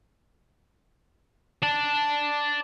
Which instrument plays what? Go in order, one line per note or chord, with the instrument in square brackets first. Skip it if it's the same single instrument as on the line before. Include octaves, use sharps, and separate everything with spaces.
[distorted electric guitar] D5 A5